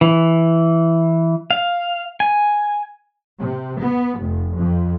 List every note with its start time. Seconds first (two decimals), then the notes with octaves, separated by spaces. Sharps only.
0.01 E3
1.51 F5
2.20 G#5
3.39 C3
3.81 B3
4.20 F1
4.56 F2